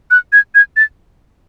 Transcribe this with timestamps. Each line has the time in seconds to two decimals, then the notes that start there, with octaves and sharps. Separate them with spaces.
0.11 F#6
0.32 G#6
0.55 G#6
0.76 A6